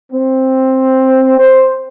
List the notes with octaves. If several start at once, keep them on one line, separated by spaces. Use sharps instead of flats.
C4
C5